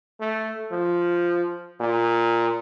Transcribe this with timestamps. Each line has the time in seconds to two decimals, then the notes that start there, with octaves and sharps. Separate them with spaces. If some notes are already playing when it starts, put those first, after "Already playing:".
0.21 A3
0.72 F3
1.81 A#2